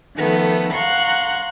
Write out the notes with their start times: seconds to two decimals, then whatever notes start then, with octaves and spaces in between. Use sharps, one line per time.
0.16 D#3 F3 A3 B3
0.73 F5 F#5 A#5 C6 C#6